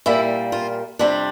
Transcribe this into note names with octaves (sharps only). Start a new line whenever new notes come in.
A#2 G3 A#3 E4
F4
F2 C3 G3 C4 D4